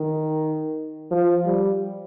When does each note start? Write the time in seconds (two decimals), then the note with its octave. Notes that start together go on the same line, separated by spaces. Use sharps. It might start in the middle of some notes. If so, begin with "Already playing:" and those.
Already playing: D#3
1.11 F3
1.46 G3